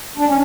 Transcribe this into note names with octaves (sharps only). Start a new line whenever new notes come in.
D4
C#4